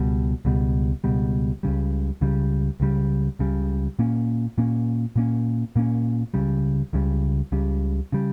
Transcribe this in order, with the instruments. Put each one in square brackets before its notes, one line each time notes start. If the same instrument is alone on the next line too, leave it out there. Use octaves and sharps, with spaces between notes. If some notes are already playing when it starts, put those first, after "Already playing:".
Already playing: [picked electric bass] C#2 B2 G3
C#2 B2 G3
C#2 B2 G3
C#2 C#3 G3
C#2 C#3 G3
C#2 C#3 G3
C#2 C#3 G3
A#2 A#3 C#4
A#2 A#3 C#4
A#2 A#3 C#4
A#2 A#3 C#4
C#2 C#3 G3
C#2 C#3 G3
C#2 C#3 G3
C#3 G3